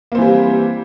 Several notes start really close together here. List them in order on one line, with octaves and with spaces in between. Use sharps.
A#3 C4 E3 G3